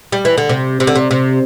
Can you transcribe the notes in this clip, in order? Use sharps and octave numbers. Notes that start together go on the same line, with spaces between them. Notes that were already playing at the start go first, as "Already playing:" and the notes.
G3
E3
D3
C3
C3
D3
C3
C3